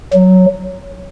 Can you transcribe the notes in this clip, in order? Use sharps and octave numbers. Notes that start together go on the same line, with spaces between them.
F#3